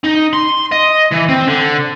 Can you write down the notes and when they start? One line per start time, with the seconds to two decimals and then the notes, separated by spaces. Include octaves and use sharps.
0.04 D#4
0.33 C6
0.72 D#5
1.12 E3
1.29 C4
1.48 D3